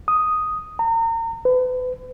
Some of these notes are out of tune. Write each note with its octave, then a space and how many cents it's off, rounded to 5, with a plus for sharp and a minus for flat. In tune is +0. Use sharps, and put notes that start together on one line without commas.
D#6 +0
A#5 -35
B4 +35